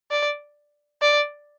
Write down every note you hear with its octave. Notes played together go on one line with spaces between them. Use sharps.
D5
D5